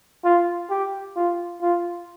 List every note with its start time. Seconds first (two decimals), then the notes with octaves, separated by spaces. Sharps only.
0.24 F4
0.70 G4
1.16 F4
1.62 F4